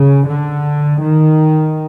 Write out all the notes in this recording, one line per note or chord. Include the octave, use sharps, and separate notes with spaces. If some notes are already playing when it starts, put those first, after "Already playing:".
Already playing: C#3
D3
D#3